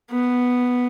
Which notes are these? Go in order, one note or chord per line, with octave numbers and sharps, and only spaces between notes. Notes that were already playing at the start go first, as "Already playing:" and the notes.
B3